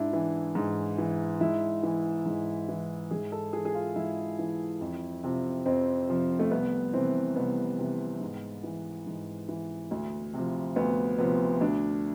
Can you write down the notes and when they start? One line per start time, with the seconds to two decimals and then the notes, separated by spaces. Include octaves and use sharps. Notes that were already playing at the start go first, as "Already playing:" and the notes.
Already playing: G#2 D4 E4
0.13 E3
0.55 G#2
0.98 E3
1.41 G#2 E4
1.83 E3
2.26 G#2
2.69 E3
3.11 G#2 G#4
3.32 A4
3.53 E3 G#4
3.65 G#4
3.75 F4
3.96 G#2 E4
4.39 E3
4.81 F2
5.24 C3 F3
5.66 F2 C4
6.09 C3 F3
6.40 A3
6.51 C2 B3
6.93 C3 E3 C4
7.36 C2 B3
7.78 C3 E3
8.20 G#2
8.64 E3
9.06 G#2
9.49 E3
9.91 D2
10.34 C3 F3
10.76 D2 B3
11.19 C3 F3 B3
11.61 D2 D4